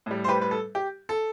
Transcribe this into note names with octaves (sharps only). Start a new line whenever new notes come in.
A2 G3
C5
G4 B4
B4
A4
G4
A4